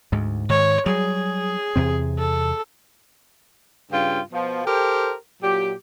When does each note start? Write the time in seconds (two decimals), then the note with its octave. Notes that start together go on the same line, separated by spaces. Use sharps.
0.12 D2 G#2
0.49 G#2 D#3 C#5
0.86 F#3 G3 G#4
1.76 E2 C3 C4
2.19 A4
3.91 G2 C#3 F4 F5 G5
4.32 B2 F3
4.65 G4 A4 A#4 C5 G5
5.42 A#2 F#3 G4